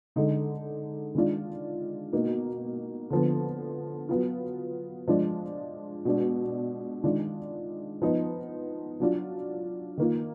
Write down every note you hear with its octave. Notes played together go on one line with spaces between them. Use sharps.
D3 G#3 D#4
D#3 G#3 D4 F4
B2 A#3 D#4
D3 F3 B3
F#3 B3 F4
F3 G#3 D4 F4
B2 G#3 D4
D#3 G#3 D4 F4
F3 B3 D#4
F#3 D4 F4
D#3 A#3 F4